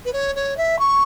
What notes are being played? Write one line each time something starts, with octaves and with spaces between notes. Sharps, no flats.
B4
C#5
C#5
E5
C#6